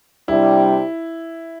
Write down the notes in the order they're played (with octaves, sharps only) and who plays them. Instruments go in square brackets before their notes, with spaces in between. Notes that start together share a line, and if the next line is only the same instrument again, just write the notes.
[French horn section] C3 G3 D4 G4 [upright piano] E4